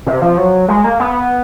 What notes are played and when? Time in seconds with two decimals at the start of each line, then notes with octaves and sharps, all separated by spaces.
0.07 C3
0.22 F3
0.38 F#3
0.68 G#3
0.84 A#3
1.00 B3